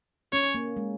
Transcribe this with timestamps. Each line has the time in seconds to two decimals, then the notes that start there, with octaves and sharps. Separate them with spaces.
0.33 C#4 C#5
0.54 A#3
0.77 G#3